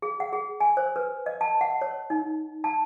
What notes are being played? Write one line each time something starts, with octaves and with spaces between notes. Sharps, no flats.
G#4
F#5
G#4
G#5
C5
B4
D#5
A5
F#5
C#5
D#4
A5